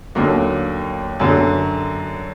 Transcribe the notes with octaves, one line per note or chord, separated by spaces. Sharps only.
D#2 D3 F#3 A#3
F#2 D3 F#3